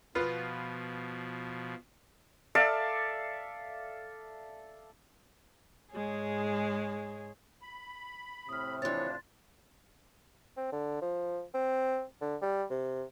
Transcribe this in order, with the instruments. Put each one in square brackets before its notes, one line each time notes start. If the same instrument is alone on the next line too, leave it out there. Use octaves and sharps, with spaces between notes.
[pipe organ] B2 F3 [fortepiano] B3 F4
[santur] A4 D5 E5 F5
[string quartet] G#2 G#3 G#4 C#5
[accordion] B5
[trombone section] A2 C3 C4 [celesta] D#6 F6
[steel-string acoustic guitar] E3 C#5 [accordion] F3 D4 [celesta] C6 A6
[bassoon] C4
D3
F3
C4
D3
G3
C3